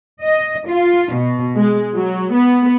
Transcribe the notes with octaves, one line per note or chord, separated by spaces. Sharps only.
D#5
F4
B2
G#3
F#3
B3